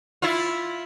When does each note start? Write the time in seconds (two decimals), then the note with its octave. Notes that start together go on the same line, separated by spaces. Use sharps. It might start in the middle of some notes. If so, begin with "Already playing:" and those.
0.22 E4 F4